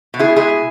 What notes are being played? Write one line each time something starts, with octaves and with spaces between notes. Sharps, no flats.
B2
E4 G#4
G#3 E4 G#4